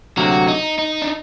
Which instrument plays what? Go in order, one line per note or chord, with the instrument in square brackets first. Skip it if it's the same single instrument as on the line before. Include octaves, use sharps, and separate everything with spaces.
[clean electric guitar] D2 C3 F#3 A#3 [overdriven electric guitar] F#4
[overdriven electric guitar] D#4
D#4
D4